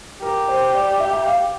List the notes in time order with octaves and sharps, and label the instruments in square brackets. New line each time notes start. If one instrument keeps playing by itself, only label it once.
[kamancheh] G4 [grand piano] A#4
[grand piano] C5
D5
E5
G5
F5